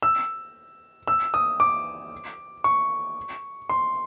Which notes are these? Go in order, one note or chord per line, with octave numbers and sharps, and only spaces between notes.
E6
E6
D#6
D6
C#6
C6